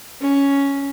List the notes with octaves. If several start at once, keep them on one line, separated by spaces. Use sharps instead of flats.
C#4